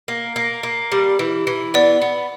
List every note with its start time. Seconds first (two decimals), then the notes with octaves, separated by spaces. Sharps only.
0.08 A#3
0.36 A#3
0.63 A#3
0.92 G3
1.19 E3
1.47 E3
1.74 B3 D5
2.02 B3